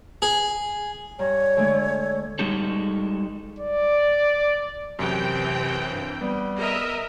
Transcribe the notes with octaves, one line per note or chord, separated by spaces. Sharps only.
G#4
G2 C#5 A#5
D3 G#3 A3
G3 G#3 D#4 F#4 G4 A4
D5
F#2 C3 E3 C4 G5
G2
G3 B3
A#4 D#5 E5